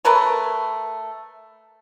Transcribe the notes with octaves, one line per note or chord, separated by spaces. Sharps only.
A3 A#4 B4 C#5